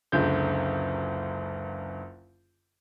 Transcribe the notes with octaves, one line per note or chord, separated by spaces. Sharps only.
F#1 C#2 D3 C#4 G6